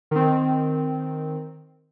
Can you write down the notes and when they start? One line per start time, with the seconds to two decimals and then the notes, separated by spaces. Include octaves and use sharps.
0.11 D#3 C4